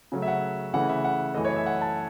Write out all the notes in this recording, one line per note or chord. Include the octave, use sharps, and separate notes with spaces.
C#3 F#3 A3 C#4
E5
F#5
C#3 E3 A3 C#4 F#5
E5
F#5
F#2 E3 A3 D#5
C#5
E5
F#5
A5